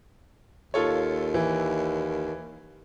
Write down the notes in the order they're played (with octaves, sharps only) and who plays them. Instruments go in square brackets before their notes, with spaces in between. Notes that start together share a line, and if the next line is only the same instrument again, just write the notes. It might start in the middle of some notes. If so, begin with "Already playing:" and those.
[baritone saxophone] D#2 [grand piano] F4 A4 C#5
[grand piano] E3